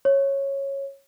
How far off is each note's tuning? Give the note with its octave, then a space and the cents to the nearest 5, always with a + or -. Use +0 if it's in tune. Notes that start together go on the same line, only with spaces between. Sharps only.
C#5 -10